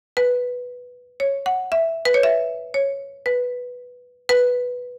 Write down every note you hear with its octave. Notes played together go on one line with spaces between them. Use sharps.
B4
C#5
F#5
E5
B4
C#5
E5
C#5
B4
B4